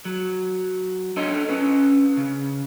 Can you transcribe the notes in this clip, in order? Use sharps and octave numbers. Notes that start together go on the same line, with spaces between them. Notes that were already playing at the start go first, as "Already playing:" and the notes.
F#3
D4 A4 C#5 D#5 C6
C#4 B4
C#3